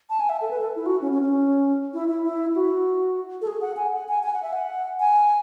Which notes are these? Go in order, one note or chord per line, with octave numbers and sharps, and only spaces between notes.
A5
G#5
E5
A4
B4
A4
E4
F#4
C#4
C#4
C#4
E4
E4
E4
F#4
A4
G#4
F#5
G#5
F#5
G#5
G#5
F#5
E5
F#5
G#5